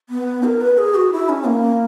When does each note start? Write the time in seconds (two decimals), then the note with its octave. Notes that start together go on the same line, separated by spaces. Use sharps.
0.09 B3
0.44 A#4
0.61 B4
0.78 G#4
0.95 F#4
1.12 E4
1.29 C#4
1.46 A#3